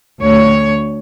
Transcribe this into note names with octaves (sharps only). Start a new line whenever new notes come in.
D2 C#5